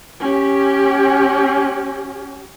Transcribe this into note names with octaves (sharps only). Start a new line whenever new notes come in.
C#4 G4